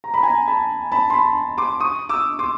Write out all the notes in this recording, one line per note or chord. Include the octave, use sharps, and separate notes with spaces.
A#5
B5
G#5 A#5
A5 B5
A5 B5
C6
A5 B5
C6 D6
C#6 D#6
D6 E6
C6 D6